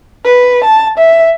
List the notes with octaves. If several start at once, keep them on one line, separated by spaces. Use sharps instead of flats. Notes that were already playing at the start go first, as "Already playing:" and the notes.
B4
A5
E5